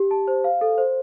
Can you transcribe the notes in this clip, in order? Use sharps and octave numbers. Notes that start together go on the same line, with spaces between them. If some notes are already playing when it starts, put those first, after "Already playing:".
Already playing: G4
A5
C5
F5
A4
C5